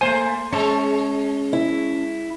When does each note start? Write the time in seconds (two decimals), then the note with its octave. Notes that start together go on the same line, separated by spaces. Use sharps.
0.01 A3 A#3 C5 G#5
0.53 G#3 C#4 A5 C#6
1.53 E4